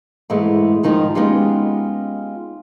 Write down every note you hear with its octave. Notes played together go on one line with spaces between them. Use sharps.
G#2 E3 G#3 A3
G#2 D#3 F3 D#4
G#3 B3 C#4 D#4 F4 G4